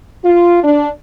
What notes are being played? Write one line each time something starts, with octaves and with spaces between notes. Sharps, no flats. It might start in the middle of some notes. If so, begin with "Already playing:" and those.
F4
D4